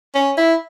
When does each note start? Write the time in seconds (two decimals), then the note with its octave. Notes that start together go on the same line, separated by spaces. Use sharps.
0.15 C#4
0.38 E4